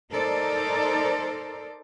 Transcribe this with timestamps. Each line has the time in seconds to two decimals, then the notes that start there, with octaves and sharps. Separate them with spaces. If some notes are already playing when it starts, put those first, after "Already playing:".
0.12 D#4 A4 A#4 C5 D5